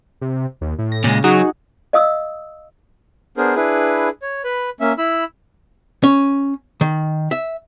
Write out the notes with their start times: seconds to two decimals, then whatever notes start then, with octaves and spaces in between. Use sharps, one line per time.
0.21 C3
0.61 D#2
0.79 A2
0.92 A#6
1.04 A#2 C#3 G#3
1.24 F#3 D#4 F#4 G#4
1.93 D#5 F5 D#6 E6
3.37 B3 D4 G#4 A#4 C5
3.56 D4 E4 G#4 B4
4.22 C#5
4.44 B4 B5
4.80 A#3 C#4 E5
4.98 E4 B5 E6
6.03 C#4
6.81 D#3
7.31 E5